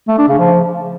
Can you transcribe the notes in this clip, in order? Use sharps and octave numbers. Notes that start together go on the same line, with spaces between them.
A3
D4
C#3
F3